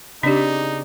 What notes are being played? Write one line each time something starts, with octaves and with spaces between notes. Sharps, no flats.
C#3 C4 D4 D#4 G4 D5